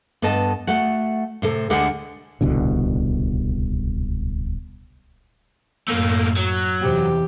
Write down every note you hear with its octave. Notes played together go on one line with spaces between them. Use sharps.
G2 B3 A4 D#5 A5
A3 F#4 F#5
A2 C3 A4
D2 D3 G#3 G4 F#5
D1 C2 B2 D3
F#2 A2 A3 A#3
F#3
E2 C3 G4